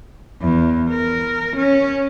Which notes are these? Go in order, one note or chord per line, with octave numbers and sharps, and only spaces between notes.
E2
A#4
C#4